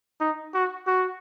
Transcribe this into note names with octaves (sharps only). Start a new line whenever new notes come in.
D#4
F#4
F#4